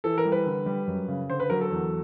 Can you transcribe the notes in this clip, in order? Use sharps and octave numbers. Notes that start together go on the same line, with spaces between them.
E3 A4
A#4
G3
B4
D3
G3
F#2
C#3
D3 C5
B4
F#3 A#4
A4
E2